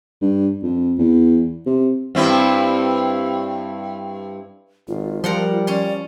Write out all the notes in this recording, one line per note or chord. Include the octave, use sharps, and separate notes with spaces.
G2
F2
E2
C3
G2 C4 E4
G#1 F4
F3 G3 A#4 F#5 C6
C#4 D5 C6